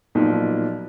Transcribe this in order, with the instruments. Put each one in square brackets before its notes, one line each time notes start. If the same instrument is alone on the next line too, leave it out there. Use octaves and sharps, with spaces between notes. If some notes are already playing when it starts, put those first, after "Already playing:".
[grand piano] B1 A#2 F3 A#3 D#4